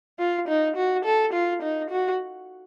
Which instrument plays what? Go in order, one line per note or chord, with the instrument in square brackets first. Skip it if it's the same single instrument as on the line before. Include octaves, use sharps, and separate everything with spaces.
[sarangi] F4
D#4
F#4
A4
F4
D#4
F#4